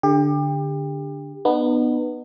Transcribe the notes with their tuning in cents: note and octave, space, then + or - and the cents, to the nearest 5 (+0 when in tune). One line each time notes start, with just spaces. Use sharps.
D3 +0 G4 +30
B3 +0 D#4 -40